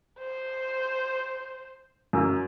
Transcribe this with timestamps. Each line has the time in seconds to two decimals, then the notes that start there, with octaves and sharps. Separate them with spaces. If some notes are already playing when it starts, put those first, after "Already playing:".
0.19 C5
2.13 F#2 E6